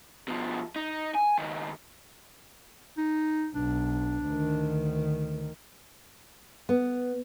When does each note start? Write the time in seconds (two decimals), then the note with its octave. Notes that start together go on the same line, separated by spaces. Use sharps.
0.28 B2 F3
0.76 D#4
1.15 G#5
1.38 C#2 D#3
2.98 D#4
3.55 B1 D4
4.26 D2 D#3
6.69 B3